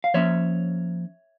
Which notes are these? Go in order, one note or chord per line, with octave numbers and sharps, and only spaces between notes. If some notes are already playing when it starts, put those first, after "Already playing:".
F5
F3 A#3 C#4 C#5 E5